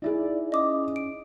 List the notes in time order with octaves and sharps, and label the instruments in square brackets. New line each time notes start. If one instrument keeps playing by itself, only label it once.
[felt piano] D#4 E4 G#4 [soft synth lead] D5
[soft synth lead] C#4 [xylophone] D#5 D6 D#6
[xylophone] D7